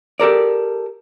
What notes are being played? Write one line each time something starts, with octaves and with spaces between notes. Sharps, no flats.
G4 A4 A#4 D5